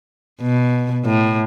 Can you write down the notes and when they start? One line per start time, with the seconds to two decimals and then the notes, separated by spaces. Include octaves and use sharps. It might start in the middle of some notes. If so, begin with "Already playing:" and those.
0.42 B2
1.05 A2